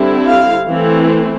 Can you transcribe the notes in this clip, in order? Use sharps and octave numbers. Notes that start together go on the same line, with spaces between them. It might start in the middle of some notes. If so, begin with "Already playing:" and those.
Already playing: D3 G3 C4 E4
F5
E3 A3 C4